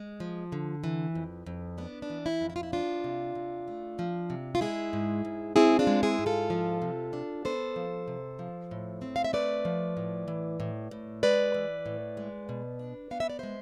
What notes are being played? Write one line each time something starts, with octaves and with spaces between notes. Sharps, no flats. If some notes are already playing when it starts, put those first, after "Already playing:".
Already playing: G#3
F3
D3
E3
F2
F2
B3 D4
D4
E3
E4
F2
E4
F4
E4
F3 D4 F4
C3
C3
A3
F3
C3
F4
G#3 E4 G#4
G#2
G#2
C4 E4 G#4
D4 F4
G#3
E4 G#4
G#2
F4 A4
F3
C3
D4
B3 A4 C5
F3
C3
F3
A2
C4
F5
E5
A3 B4 D5
F3
A2
E3
A2
A2
G#3 B4 D5
E3
A2
G#3
B2
D4
B3 F5
E5
D5
G#3 C5 E5